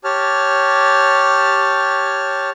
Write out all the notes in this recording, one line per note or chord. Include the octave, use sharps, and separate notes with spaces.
G4 C#5 A5 F6